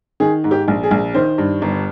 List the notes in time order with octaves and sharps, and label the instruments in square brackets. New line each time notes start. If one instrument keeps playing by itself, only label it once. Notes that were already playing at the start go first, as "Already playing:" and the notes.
[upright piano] D#3 G#4
G#2
G4
A#1
G#4
A#1
D#3 C5
G2
G1